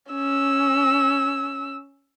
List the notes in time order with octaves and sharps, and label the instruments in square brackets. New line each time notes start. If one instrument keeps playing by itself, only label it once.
[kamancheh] C#4 E6